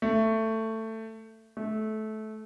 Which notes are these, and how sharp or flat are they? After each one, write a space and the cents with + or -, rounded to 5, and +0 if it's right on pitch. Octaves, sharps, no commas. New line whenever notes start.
A3 +15
A3 -20